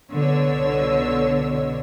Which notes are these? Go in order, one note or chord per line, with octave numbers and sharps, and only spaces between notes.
C2 B2 D3 C#5 E6